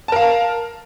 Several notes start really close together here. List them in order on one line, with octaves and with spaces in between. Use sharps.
A5 A#4 F5